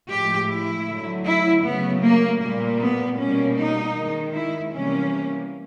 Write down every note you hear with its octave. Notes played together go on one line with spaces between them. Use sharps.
A2 F3 G#3 G4
E4
D3 F#3 A3
E4
C#3 F#3 A3 B3
A#3
A#2 G3 A#3
B3
B2 G3 A#3 C#4
D#4
D#3 G#3
E4
C3 E3 G3 A#3 C#4